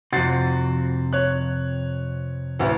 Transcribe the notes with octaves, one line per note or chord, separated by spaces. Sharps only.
F2 C3 F#4 A6 C7
C#5 F#6
A1 D2